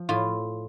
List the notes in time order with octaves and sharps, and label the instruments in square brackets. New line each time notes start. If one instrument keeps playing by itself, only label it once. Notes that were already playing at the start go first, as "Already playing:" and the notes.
Already playing: [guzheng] F3
A2 F4